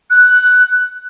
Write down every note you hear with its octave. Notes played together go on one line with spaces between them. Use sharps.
F#6